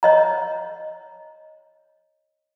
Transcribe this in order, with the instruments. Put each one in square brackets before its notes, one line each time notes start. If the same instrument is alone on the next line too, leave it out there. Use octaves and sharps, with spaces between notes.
[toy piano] C#5 D#5 A#5